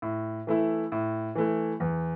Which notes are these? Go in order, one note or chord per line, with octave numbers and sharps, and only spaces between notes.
A2
E3 A3 E4
A2
E3 A3 E4
E2